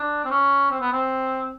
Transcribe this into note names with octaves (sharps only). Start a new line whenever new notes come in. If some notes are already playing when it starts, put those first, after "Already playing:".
Already playing: D4
C4
C#4
C4
B3
C4